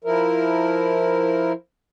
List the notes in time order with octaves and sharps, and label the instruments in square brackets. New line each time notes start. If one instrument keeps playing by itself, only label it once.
[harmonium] F3 E4 A#4